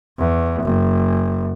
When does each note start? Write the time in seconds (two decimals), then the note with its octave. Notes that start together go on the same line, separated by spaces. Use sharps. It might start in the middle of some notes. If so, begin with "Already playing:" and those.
0.18 E2
0.62 F#1